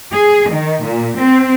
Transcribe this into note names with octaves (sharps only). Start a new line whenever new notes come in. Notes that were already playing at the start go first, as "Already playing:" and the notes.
G#4
D#3
A#2
C4